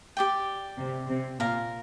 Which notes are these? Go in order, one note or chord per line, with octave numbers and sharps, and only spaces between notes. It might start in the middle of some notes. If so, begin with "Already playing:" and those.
G4 D5 G5
C3
C3
A#2 A#4 F5 A#5